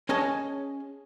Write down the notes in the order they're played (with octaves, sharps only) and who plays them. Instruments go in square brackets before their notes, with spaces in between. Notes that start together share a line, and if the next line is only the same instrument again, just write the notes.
[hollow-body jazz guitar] C#4 G#4 C#5 D#5 G#5 A5